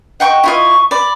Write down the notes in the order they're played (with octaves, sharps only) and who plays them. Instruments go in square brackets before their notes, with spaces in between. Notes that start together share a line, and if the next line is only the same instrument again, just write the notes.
[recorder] D#5 [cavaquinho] F#5 G5 C#6
[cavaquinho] E4 F4 D#5 [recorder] C#6
[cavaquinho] D5 [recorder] B5